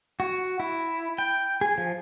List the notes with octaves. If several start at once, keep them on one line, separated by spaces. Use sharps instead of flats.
F#4
E4
G5
G#4
F3